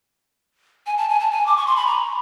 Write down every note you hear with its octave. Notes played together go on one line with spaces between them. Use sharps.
G#5
A5
G#5
A5
G#5
D6
C#6
C6
B5
A#5